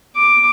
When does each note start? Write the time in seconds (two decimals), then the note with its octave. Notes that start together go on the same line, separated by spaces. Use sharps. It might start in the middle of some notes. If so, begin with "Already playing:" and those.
0.16 D6